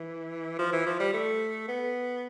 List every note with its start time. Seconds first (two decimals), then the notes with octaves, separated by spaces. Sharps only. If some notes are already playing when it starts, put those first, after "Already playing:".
Already playing: E3
0.59 F3
0.73 E3
0.87 F3
1.00 G3
1.14 A3
1.68 B3